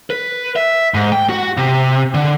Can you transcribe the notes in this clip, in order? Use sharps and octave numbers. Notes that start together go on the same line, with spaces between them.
B4
E5
G#2
G5
F#4
C3
D3